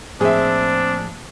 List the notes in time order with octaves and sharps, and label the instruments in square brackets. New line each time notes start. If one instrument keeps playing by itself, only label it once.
[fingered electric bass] A2 F3 A#3 [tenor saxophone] C4 [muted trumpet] D4 [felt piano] G#4 E5